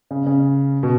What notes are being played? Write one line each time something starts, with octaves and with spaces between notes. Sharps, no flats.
C#3
C#3
B2